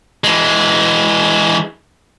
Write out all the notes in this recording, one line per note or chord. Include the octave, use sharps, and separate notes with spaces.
E3 G#3